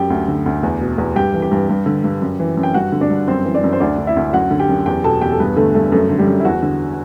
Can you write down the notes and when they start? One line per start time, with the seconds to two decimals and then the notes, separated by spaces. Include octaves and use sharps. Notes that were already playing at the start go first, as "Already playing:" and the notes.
Already playing: F#2 G4 G5
0.10 D2
0.28 D3
0.46 D2
0.63 E2
0.81 B2
0.98 E2
1.16 G2 G4 G5
1.34 E3
1.42 G4 G5
1.51 G2
1.69 G2
1.86 D3
2.04 G2
2.22 F#2
2.40 E3
2.57 F#2
2.63 G5
2.74 G2 F#4 F#5
2.92 D3
3.01 D4 D5
3.10 G2
3.28 F#2 C4 C5
3.45 E3
3.55 D4 D5
3.64 F#2
3.73 C5
3.80 D2 D4 D5
3.98 D3
4.07 E4 E5
4.16 D2
4.33 F#2 F#4 F#5
4.51 D3
4.59 G4 G5
4.69 F#2
4.86 E2 G4 G5
5.04 B2 A4 A5
5.21 E2 G4 G5
5.32 A4
5.40 G2 B3 B4
5.57 D3 A3 A4
5.74 G2 A3 A4
5.92 F#2 A3 A4
6.09 D3
6.19 G3 G4
6.27 F#2
6.40 E4
6.45 E2 F#4
6.63 D3